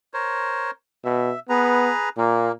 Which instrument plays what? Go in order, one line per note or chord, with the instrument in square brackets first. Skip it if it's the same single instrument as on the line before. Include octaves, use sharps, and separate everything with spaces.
[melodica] A#4 C5 C#5
[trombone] B2 [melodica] E5
[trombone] B3 [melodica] G#4 B4 A#5
[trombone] A#2 [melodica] A#3